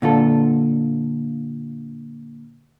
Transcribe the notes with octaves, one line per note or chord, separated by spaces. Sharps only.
A#2 D3 F4 A4